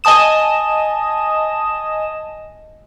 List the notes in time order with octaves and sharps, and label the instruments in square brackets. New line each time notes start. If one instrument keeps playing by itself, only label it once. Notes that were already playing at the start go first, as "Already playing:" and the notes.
[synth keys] D#5 G#5 A5 D#6 E7